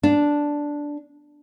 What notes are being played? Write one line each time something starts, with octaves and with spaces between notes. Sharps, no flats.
D4